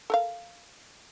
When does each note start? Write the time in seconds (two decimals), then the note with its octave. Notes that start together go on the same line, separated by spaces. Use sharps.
0.10 A4 A#4 F5